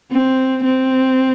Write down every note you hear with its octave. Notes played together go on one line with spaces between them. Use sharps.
C4
C4